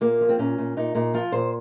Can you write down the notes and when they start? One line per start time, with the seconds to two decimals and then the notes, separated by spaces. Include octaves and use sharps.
0.01 A#2 A#3
0.21 F3
0.29 C4
0.39 A#2 C#4
0.58 A#2
0.77 A#2 D#4
0.95 A#2 D#4
1.14 F3 F4
1.32 A#2 C5